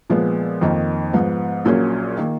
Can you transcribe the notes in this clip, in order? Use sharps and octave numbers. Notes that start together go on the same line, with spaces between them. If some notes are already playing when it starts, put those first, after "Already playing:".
A#2 F3 G#3 B3
F2 D#3 A#3 D#4
G#2 F3 B3
A#1 A#2 F#3 A#3 C#4
D#3 A#3